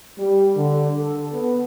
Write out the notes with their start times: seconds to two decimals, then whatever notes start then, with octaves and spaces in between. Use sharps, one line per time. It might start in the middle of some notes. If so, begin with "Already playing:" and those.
0.19 G3
0.56 D3
1.01 A4
1.31 B3